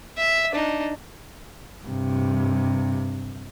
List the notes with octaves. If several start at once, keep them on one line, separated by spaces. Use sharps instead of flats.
E5
D4 D#4
G2 C3